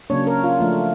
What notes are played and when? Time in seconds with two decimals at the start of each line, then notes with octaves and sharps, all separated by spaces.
0.10 C#3 F#3 A#3 D4 C#5
0.27 A#4
0.44 F4
0.60 F3 A3 D4